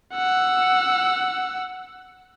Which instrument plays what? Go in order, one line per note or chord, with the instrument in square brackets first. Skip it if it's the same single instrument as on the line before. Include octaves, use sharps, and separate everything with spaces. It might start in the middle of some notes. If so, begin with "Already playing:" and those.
[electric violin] F#5 E6